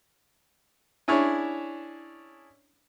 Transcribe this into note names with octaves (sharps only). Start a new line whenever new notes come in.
C#4 D4 E4 G#4 C#5